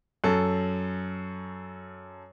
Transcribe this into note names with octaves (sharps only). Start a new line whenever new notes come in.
F#2 A4